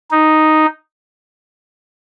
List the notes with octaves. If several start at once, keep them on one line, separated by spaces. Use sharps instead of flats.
D#4